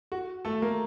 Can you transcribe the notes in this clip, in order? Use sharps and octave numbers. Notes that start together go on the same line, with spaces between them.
F#4
A3 A4
A#3 A#4